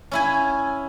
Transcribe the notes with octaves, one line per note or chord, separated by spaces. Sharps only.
C#4 E4 G#5